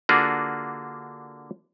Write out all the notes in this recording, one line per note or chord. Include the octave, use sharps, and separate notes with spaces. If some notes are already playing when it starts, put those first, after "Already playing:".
D3 A#3 D4 F4 F#4 G#4